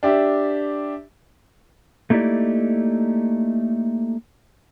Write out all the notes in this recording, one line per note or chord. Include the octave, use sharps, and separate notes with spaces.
D4 G4 E5
A3 A#3 D#4 E4 G4 D5